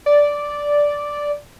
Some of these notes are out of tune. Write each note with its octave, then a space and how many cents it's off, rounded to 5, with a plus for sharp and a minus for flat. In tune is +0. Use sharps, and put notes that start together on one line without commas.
D5 -5